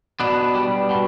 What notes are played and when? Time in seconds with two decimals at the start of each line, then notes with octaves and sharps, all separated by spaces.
0.20 B2 B3 D4
0.55 G3
0.90 B2